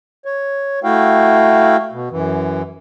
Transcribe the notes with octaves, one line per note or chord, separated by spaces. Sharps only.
C#5
A3 E4 F#4 F5 G5
B2
F#2 E3